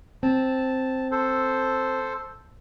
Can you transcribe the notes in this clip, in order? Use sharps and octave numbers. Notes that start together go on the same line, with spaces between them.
C4 A5
A4 C5